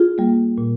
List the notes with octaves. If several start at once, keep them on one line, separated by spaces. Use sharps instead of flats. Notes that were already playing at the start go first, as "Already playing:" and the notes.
Already playing: F4 G#4
G3 A#3
A#2